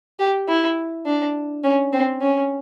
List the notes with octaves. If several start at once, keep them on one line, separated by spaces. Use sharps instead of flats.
G4
E4
D4
C#4
C4
C#4